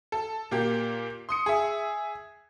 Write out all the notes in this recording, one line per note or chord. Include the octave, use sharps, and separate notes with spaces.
A4
A#2 A#3 G4
C6 D#6 C#7
G#4 E5